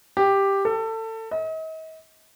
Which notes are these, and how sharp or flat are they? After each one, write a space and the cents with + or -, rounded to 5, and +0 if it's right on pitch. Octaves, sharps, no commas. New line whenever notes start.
G4 +5
A4 +25
D#5 +40